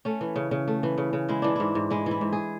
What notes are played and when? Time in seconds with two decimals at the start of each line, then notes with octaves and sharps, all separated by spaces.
0.05 A3 C#4
0.21 E3
0.36 C#3
0.51 C#3
0.68 A3
0.83 E3
0.98 C#3
1.13 C#3
1.29 G#3 E4
1.42 E3 D4
1.56 G#2 E4
1.75 G#2
1.90 G#3 E4
2.06 E3 E4
2.21 G#2
2.32 G#4